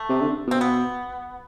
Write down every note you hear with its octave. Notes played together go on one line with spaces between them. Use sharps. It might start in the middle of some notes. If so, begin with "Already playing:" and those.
Already playing: A3
C3
D3
B2 C4
B3